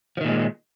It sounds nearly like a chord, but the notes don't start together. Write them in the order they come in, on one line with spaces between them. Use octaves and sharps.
F3 D#3 A#2 G#3